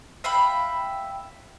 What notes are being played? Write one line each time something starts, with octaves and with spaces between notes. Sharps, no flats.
E5 F5 G5 B5